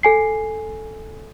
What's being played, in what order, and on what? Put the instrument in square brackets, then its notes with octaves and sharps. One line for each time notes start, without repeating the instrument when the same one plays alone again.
[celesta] A4 G#5 C7